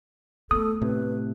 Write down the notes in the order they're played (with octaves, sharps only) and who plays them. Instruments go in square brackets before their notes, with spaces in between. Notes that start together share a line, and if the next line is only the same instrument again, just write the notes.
[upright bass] A3 B3 [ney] A4 [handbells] D#6
[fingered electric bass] A2 C3 [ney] B4